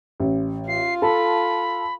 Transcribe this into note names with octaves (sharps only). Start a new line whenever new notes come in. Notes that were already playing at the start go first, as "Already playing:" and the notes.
A1
F4 C7
A4 A5 B5